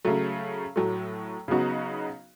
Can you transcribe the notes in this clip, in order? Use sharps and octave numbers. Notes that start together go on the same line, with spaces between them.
C#3 F#3 A3
A2 F#3 A3
C#3 F#3 B3 D#4 F#4